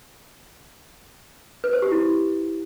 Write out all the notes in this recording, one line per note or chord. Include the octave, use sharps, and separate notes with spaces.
B4
C5
G4
E4